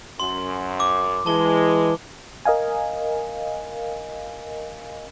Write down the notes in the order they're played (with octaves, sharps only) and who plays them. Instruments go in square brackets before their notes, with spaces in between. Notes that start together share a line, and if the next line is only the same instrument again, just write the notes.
[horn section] F#2 [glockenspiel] C6
[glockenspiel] D6
[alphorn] E3 [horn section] G#3 [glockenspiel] A5 G7
[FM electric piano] A#4 D#5 F5 G#5